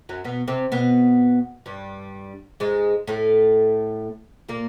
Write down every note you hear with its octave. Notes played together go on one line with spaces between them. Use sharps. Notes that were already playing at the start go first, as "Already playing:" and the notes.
F#2 F#3
B2 B3
C3 C4
B2 B3
G2 G3
G#2 G#3
A2 A3
A#2 A#3